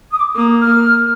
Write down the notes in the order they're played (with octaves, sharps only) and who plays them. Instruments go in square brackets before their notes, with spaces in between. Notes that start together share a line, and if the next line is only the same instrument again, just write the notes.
[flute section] D#6
D6
[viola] A#3 [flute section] D#6
[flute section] F6